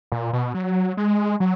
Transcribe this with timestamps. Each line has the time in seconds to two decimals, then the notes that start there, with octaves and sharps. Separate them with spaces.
0.12 A#2
0.33 B2
0.54 F#3
0.97 G#3
1.40 F#3